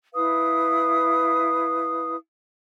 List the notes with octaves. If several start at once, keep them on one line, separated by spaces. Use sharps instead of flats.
E4 B4 F5 D#6